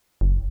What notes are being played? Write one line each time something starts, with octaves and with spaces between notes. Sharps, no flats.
F#1